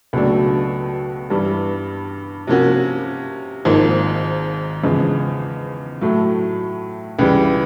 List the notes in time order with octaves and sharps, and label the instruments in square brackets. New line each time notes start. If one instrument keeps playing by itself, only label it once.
[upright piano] C#2 B2 F#3 A3 D4
G2 E3 G3
C3 F3 A#3 C#4 F#4
G#1 G#2 F3 A#3
E2 C#3 F3 G#3
A2 F#3 A3
C#2 C#3 E3 G3